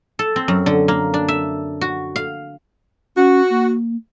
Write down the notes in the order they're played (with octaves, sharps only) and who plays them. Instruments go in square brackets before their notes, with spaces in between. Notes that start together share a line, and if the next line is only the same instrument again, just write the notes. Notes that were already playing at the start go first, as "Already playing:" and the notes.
[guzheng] A4
C4
F#2
D3
A#3
D4
E5
F#4
F5
[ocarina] C#4 [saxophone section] F#4
[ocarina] A#3